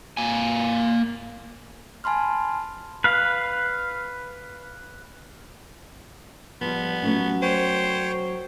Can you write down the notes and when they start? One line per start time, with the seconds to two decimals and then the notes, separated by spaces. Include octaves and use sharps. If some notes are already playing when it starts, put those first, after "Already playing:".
0.17 A#3 G#5
2.04 G#5 A5 B5 C6 F6
3.04 B4 F5
6.61 F3 G3 B3
7.03 F#3 A3 C#4
7.42 C5 C#5 G5